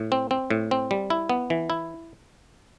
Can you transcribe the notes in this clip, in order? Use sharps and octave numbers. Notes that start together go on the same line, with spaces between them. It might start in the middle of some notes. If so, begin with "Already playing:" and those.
Already playing: A2
C4
C4
A2
C4
G3
E4
B3
E3
E4